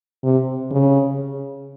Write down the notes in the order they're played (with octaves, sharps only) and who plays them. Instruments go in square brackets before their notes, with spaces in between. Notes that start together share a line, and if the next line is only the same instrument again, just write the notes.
[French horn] C3
C#3